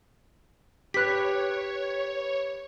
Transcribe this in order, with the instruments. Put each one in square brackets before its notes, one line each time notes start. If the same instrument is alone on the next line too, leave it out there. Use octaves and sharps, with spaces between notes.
[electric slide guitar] G4 B4 [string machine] C#5 [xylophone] F#6 B6